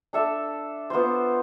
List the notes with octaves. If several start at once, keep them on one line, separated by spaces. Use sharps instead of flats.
D4 A4 E5
B3 F4 C5